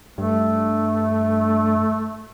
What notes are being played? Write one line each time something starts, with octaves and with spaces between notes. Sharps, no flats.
G2 A3